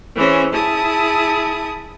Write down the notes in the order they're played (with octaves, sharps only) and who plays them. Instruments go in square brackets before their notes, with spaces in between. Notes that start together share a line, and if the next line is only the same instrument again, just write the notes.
[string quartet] E3 C#4 G#4 C5
E4 G#4 A5 D#6